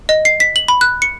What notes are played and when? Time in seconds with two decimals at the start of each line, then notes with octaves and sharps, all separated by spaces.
0.09 D#5
0.25 C7
0.40 B6
0.56 F#7
0.68 B5
0.81 F#6
1.02 C#7